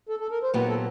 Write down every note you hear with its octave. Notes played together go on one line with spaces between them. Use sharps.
A4
A4
A#4
C5
A#2 F#3 B3 D#4 G4 B4
A4